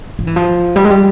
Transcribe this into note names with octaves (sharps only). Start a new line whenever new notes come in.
F3
E3
F3
G3
G#3
G3